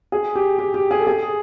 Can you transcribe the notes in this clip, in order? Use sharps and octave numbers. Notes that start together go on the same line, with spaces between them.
G#4
G4
G4
G4
G#4
A4
G#4